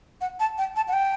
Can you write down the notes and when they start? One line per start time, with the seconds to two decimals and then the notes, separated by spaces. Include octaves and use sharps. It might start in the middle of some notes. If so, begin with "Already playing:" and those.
0.21 F#5
0.40 A5
0.58 G5
0.76 A5
0.88 F#5
0.93 G5